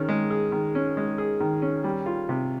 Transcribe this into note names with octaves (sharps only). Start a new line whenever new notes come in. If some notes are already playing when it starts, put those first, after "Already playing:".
Already playing: D#3 C#4 G#4
G#3
G#4
D#3
C#4
G#3
G#4
D#3
C#4
G3
F4
C3